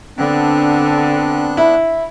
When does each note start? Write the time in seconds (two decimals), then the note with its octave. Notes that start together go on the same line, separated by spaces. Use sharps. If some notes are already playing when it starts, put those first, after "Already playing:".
0.18 D3 B3 C4 D4 F#6
1.57 E4